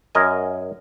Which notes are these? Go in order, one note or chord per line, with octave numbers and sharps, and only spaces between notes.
F#2 A#4 D#5 G#5